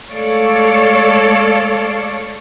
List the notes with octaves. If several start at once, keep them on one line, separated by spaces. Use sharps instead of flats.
G#3 A3 A4 C#5 D5 F5